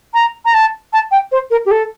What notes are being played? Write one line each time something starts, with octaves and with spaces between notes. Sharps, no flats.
A#5
A#5
A5
A5
G5
C5
A#4
G4
A4